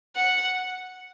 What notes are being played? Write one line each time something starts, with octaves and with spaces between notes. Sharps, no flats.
F#5